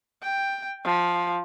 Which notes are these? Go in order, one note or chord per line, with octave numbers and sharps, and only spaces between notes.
G5
F3